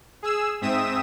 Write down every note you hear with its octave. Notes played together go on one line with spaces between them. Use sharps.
G#4 E6
G#2 C4 E5 D#6 E7